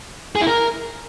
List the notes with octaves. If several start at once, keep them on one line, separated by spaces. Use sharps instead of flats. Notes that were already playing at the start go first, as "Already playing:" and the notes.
G#4
E4
A#4